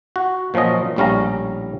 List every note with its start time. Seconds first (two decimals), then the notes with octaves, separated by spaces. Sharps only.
0.16 F#4
0.54 A#2 F3 F#3 C#4 D#5
0.96 A#1 A2 G3 C#4 F5 A#5